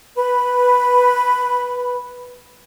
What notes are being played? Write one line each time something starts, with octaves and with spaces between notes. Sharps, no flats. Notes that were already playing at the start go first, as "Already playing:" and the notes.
B4 B5